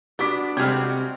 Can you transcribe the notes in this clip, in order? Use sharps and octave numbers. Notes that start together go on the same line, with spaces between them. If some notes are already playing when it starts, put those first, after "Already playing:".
B3 D4 F#4 D6 B6
C3 G3 G#3 C4 F#4 A4 F6 G#6